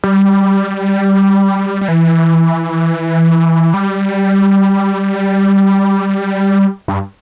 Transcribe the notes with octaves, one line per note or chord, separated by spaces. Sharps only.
G3
G3
E3
G3
G2